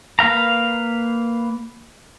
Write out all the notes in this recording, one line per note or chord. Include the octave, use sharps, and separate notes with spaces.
A#3 B4 F5 A#5